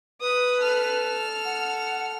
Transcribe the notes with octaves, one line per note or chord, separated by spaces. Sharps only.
B4 D#6
A4 F6
F#5